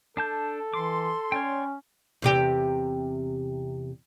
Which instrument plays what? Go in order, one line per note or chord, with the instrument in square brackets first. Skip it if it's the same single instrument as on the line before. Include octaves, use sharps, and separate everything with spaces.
[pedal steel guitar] D4 A5 G6 [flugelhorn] A4
[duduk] E3 [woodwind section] C6 [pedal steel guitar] D6
[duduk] C#4 [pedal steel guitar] C#5 D5 G5
[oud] E2 C3 G4